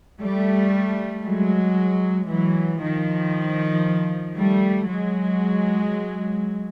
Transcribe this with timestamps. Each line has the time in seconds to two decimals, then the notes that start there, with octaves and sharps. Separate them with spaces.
0.20 G3 A3
1.24 F#3 G#3
2.28 E3 F#3
2.80 D#3 F3
4.36 G3 A3
4.88 F#3 G#3